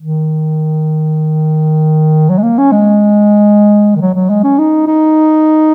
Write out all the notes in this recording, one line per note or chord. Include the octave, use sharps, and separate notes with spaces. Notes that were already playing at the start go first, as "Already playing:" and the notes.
D#3
F#3
G#3
A#3
C#4
G#3
D#3
F#3
F#3
G#3
C#4
D#4
D#4